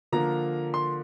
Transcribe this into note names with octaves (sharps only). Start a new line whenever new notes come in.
D3 F3 A#3 A#5
C6